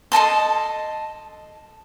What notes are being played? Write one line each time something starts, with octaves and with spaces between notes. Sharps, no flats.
A4 D#5 A5 C6